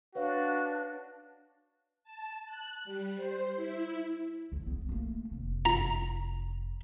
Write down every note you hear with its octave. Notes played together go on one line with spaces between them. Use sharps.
D4 F#4 B4 C#5 F5
A5
F#6
G3
C5
E4
C#2 F3
A1 B3
A3 A#3
F1 C3
A#5